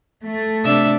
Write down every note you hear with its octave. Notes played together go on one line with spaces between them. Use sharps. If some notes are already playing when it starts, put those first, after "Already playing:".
A3
C3 D4 E5